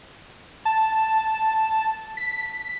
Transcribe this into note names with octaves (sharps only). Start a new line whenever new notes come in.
A5
B6